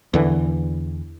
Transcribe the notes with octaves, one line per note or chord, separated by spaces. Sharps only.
E2 D3 E3